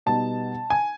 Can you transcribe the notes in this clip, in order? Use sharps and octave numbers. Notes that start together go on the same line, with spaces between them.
B2 G3 B3 D#4 A5
G#5